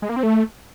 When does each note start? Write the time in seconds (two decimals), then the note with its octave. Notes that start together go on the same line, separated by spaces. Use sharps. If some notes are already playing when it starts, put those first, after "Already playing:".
0.02 G#3
0.09 A#3
0.16 C4
0.23 A3